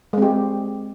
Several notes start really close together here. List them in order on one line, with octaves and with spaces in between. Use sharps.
G#3 C4 G4